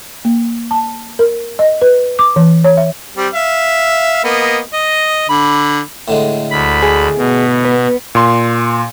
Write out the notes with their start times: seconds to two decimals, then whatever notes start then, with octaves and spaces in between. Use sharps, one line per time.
0.25 A#3
0.71 A5
1.19 A#4
1.59 D#5
1.82 B4
2.19 D6
2.36 E3
2.64 C#5
2.77 E5
3.17 G3 C4
3.34 E5 F5
4.24 A#3 B3 D#5
4.73 D#5
5.29 D3 B5
6.08 A2 D3 G#3
6.51 D2 B5
6.82 G#4
7.17 B2 B3
7.65 B4
8.15 A#2 C6